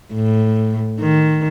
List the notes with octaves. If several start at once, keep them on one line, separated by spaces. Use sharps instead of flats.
A2
D#3